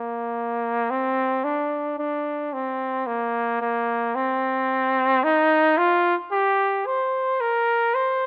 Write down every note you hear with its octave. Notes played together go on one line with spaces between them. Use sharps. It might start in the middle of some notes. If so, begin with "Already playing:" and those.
Already playing: A#3
C4
D4
D4
C4
A#3
A#3
C4
D#4
F4
G4
C5
A#4
C5